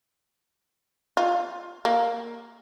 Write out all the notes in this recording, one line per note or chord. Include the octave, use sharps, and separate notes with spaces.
F4
A#3